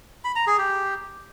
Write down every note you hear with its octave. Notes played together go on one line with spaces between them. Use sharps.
B5
A#5
G#4
G4